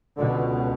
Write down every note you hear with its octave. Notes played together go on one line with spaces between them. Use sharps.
C#2 B2 D3